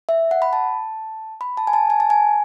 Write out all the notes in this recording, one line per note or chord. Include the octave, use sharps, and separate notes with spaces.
E5
F#5
B5
A5
B5
A5
G#5
A5
G#5
A5
G#5